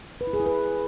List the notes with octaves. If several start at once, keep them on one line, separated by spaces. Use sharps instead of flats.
B4
E4
G#4
E4
B4